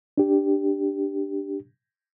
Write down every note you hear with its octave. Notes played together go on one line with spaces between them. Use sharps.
D4 G4